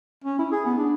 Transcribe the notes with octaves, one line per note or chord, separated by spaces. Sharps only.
C#4
E4
G#4
B3
D4